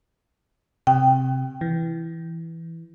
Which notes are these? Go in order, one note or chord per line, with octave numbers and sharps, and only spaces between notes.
C3 G5
E3